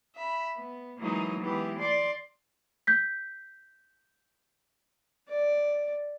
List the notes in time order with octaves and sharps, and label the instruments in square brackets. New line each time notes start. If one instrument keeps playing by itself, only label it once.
[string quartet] E5 B5
B3
E3 F#3 G#3 A#3 D#4
E3 G#3 B3 G4
D5 C6 D6
[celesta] G6 B6
[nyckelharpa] D5